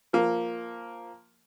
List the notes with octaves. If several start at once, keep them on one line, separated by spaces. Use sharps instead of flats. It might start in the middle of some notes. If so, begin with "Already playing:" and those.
F3 A#3